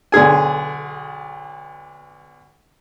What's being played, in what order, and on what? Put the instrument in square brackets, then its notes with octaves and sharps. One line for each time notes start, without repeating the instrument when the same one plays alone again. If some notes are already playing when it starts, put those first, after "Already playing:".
[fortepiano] B1 D3 G#4 G#5